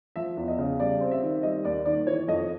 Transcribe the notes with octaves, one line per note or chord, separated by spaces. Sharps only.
F3 E5
E2
D#5
C#3
G3 D5
C4
E5
D#3
G3 D#5
D#2 D5
D#3 D5
E3 C#5
F2 D#5